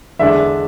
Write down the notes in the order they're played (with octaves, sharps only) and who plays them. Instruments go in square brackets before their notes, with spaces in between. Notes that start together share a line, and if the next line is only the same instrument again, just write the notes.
[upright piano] E2 D3 G#3 D4 E5